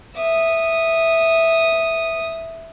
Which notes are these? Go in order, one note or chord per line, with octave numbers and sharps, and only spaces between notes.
E5 D#6